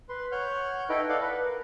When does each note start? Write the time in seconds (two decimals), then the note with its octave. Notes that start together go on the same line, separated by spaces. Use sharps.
0.09 B4 C6
0.32 C#5 F#5 F6 G6
0.89 D#4 E4 A4 B4 D#5 G5
1.09 A4 D5 D#5 F5 F#5
1.21 B4
1.45 A#4